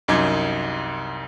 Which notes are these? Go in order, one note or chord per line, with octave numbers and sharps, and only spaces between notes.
C2 F#2 D#4 D6 G#6